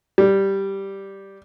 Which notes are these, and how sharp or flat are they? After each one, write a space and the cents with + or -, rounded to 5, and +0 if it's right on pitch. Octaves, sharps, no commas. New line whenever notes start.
G3 -5